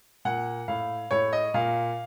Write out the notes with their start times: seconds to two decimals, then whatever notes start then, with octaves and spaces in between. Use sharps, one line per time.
0.25 A#2 F#5
0.68 A2 F5
1.11 A2 C#5
1.33 D#5
1.54 A#2 F5